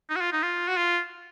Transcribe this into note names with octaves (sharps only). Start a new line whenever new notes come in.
D#4
F#4
F4
D#4
F4
F#4
F4